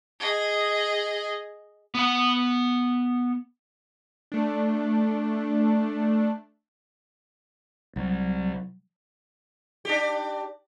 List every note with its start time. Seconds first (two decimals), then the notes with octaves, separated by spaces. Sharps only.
0.20 G#4 D#5
1.95 B3 F#5
4.32 A3 D4
7.96 C2 F#3
9.85 D4 G4